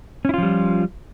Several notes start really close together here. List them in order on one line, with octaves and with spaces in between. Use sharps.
C#4 E4 F4 F3 G3